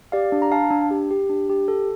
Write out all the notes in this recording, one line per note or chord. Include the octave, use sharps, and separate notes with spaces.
G4 D5 F5
D4
A#5
D4 F5 A5
D4
G4
G4
D4
G4
A4